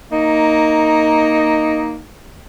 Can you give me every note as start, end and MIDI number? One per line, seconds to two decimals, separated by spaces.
0.11 1.99 58
0.11 1.99 63